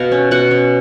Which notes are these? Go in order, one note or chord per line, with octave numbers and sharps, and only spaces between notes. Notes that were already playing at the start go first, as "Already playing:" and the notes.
Already playing: B2 F5
C#4
B2 F#5
C#4